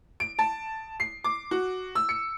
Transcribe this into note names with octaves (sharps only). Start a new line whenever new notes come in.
D7
A5
C7
D6
F#4
E6
C#7